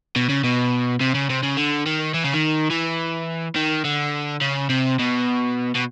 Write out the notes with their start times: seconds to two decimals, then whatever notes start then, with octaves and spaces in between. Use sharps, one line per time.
0.16 B2
0.29 C#3
0.44 B2
1.00 C3
1.14 C#3
1.30 C3
1.43 C#3
1.57 D3
1.86 D#3
2.14 E3
2.24 C#3
2.33 D#3
2.71 E3
3.56 D#3
3.85 D3
4.41 C#3
4.70 C3
4.99 B2
5.75 B2